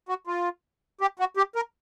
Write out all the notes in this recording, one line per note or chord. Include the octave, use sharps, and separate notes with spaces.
F#4
F4
G4
F#4
G4
A#4